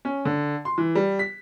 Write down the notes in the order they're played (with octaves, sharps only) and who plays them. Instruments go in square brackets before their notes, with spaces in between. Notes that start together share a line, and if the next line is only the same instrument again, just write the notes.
[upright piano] C#4
D3
C6
E3
G3
B6